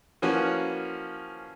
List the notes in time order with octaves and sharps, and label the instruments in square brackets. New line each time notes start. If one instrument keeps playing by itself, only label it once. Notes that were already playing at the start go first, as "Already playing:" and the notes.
[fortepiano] E3 F3 A#3 C#4 F#4